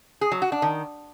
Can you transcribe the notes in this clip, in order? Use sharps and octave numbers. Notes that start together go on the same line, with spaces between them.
G#4
F#3
F#4
D4
D#3